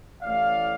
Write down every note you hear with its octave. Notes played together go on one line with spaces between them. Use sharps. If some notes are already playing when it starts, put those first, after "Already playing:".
A1 A2 A3 D5 F5